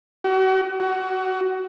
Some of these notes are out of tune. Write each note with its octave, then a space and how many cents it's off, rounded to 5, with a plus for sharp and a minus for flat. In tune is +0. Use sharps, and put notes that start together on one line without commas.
F#4 +40
F#4 +20